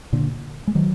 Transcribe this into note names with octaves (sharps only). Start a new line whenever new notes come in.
A#2 D3
G#3
D#3 F#3